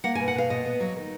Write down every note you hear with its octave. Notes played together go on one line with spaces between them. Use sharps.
A#3 F#5
G#5
B2
F#5
B2 F5
A#2 D#5
B3
F#3
D#3